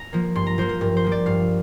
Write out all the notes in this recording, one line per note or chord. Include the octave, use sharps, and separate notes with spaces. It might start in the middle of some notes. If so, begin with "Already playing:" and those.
Already playing: A#5
F3 A#3
G2 C6
A#5
F3 A#3 C5
A#4
G2 A#4
C5
F3 A#3
D5
G2 F5